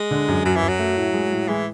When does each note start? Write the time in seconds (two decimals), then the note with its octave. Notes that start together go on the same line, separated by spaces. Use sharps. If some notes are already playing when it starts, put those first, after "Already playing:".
Already playing: G#3
0.11 D3
0.28 F#2
0.45 F#2 F#3
0.56 E3
0.63 F#2
0.68 F#3
0.79 A3
0.96 A2
1.13 G#3
1.31 A2
1.48 E3 G#3